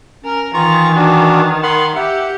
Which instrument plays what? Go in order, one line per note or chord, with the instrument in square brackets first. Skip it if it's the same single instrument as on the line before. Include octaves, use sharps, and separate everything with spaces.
[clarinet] C#4 [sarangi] A#4
[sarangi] D#3 [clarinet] E3 [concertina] F4 A#5 C#6
[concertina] D4 F#4
[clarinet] A#4 [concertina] F#5 B5 C6
[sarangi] G4 [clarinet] E5 [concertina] F#5